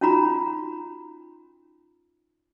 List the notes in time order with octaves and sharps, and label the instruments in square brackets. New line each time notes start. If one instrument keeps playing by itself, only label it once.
[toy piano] C#4 D#4 F4 F#4 A#5 B5